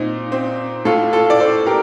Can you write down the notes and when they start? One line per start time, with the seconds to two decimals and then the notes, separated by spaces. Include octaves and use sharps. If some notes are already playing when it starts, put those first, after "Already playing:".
Already playing: A#2 C4 D#4
0.32 C4
0.85 A2 F4 A4
1.13 F4 A4
1.30 D5
1.40 A4 C5
1.66 G4 A#4